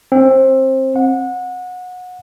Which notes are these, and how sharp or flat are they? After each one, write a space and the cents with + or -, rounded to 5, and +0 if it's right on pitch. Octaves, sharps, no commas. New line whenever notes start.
C4 +20
F#5 -25